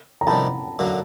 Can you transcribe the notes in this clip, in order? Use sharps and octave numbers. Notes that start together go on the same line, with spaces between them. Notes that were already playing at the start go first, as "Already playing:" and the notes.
A#5
F2 C3 D#3 G3 A5 B5
F#2 D3 F#3 A#3